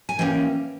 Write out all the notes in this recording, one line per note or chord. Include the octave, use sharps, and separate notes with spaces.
G#5
E3 A#3 C#4 G5